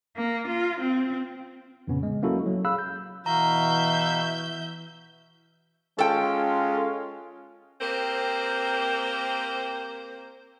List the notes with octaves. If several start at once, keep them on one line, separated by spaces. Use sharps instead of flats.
A#3
F4
C4
F2 A#2 C#3 B3 C#4
G#3
F#3 A#3 C#4 E4 F#4 A4
F#3
G#4 F5 B5 E6 F#6
G6
B2 E3 F#4 E5 F5 A#5 G6
G#3 C#4 F4 A4 G5
A#3 C4 G4 A#4 C5